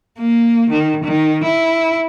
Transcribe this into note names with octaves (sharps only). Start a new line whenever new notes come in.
A#3
D#3
D#3
E4